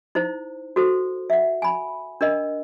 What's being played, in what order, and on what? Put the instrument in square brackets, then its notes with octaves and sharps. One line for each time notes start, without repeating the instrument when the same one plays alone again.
[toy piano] D#4 E4 C5
F#4 A4 C5
E5 F#5
G#5 B5
D4 A#4 D#5